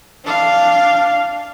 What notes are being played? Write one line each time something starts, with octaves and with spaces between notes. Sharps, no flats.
D4 F5